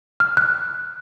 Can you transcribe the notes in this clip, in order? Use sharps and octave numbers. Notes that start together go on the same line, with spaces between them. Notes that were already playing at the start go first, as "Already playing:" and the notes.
F6
F#6